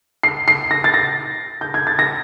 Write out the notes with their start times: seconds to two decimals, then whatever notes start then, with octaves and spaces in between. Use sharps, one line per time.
0.23 C7
0.48 C7
0.71 A#6
0.84 A6
0.94 A#6
1.61 G6
1.74 G#6
1.87 A6
1.99 A#6